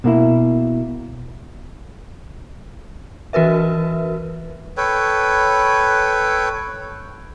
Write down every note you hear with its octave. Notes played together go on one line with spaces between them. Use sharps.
B2 A#3 E4
E3 F#4 A#4 B4 E5
A4 B4 C#5 G5